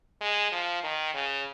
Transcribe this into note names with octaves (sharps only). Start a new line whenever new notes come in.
G#3
F3
D#3
C#3